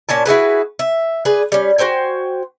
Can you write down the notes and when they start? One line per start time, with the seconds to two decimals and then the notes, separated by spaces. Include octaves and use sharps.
0.09 A#2 C#4 G#5 A5
0.26 E4 F#4 G#4 B4
0.79 E5
1.25 G#4 B4 D5
1.52 G3 C#4
1.78 F#4 C5 G5 G#5